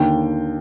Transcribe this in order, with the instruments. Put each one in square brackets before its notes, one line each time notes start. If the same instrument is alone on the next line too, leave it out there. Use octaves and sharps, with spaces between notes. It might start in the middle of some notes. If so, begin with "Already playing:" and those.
Already playing: [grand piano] D#2 D3 G5